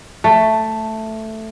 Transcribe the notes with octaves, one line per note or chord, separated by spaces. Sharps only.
A3